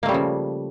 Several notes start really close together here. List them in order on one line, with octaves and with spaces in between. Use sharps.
A#3 A3 G3 C#3 F3